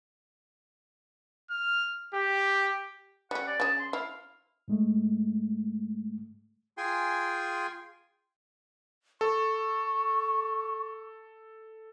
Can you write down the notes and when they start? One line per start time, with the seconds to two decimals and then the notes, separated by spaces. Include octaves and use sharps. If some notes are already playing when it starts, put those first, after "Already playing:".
1.50 F6
2.14 G4
3.31 G3 C#4 F#5
3.47 D5
3.60 C#3 G#4 A5
3.79 C6
3.93 E4 F5
4.68 G#2 G#3 A3
6.78 F4 G#4 G5 G#5 C6
9.21 A4 C#6